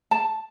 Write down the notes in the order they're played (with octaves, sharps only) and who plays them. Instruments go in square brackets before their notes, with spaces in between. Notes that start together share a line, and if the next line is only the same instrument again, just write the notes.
[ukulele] A5